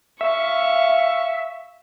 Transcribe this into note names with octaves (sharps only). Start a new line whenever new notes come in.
E5 F5 C#6